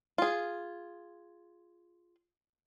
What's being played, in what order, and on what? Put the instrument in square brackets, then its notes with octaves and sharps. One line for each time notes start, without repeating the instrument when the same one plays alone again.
[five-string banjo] F4 G#4